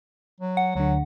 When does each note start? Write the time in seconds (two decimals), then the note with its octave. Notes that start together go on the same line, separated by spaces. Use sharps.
0.40 F#3
0.57 F#5
0.76 D2 D3 F#3